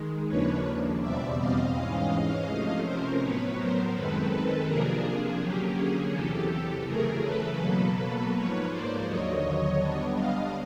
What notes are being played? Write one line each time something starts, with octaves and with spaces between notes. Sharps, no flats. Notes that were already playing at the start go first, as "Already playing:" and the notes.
Already playing: D#3 G#3
D#2 C#3 F3 A#3 D4 B4 C#5
E2 B2 G3 C4 D5 E5
D#5 F5
G#2 E3 G#3 C#4 D#5 F5
C3 F3 A3 C#4
A#4 C5
A2 F#3 B3 B4 C#5
A#4 C5
F#2 D#3 G#3 C4 A4 B4
A4 B4
C3 F3 A#3 D4 G#4 A#4
G#4
D3 F#3 A#3 C#4 G4
G#4
E2 C3 E3 G4 A4
F#2 C#3 E3 A3 G#4 A#4
A4 B4
B2 F#3 A#3
A4 B4
G#2 F3 A#3 B4 C#5
C5 D5
D#2 D3 F#3 C#5 D#5
D3 G3 B3 D4
D#5 F5